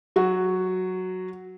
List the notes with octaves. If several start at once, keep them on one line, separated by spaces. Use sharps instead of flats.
F#3 F#4